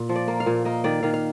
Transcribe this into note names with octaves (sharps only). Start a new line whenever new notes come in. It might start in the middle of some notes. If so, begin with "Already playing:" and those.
Already playing: A#2
F3
D5
A#3
F5
A#2
A#3 D#5
D#3 D5
D#3 F5
F5